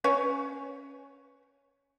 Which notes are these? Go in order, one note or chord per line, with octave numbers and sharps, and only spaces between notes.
C#4 B4 C#5